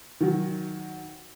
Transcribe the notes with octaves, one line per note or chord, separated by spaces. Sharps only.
D#3 F#3